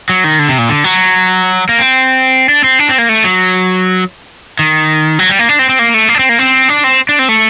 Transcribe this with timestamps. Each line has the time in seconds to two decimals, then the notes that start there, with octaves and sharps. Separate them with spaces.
0.09 F#3
0.24 D#3
0.39 D3
0.49 C3
0.58 A#2
0.69 D3
0.84 F#3
1.69 A#3
1.79 C4
2.49 D4
2.64 C4
2.79 D4
2.89 C4
2.98 A#3
3.09 A3
3.24 F#3
4.59 D#3
5.19 F#3
5.29 G3
5.39 A#3
5.49 D4
5.59 C4
5.69 C4
5.79 A#3
5.94 A3
6.09 A#3
6.15 D4
6.19 C4
6.29 A#3
6.39 C4
6.69 D4
6.84 C4
7.09 D4
7.19 C4
7.29 A3